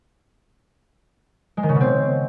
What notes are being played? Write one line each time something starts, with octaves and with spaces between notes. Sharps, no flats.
G#3
D#3
C#3
B2
C4